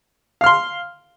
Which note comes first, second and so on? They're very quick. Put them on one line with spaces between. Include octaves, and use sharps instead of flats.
F5 F6 C6